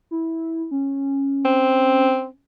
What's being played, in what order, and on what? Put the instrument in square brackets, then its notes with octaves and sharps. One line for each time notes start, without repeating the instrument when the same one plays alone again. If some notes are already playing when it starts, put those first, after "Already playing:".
[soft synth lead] E4
C#4
[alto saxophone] C4